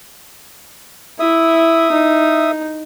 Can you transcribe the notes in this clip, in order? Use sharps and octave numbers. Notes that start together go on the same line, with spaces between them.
E4 E5 D#6
D#4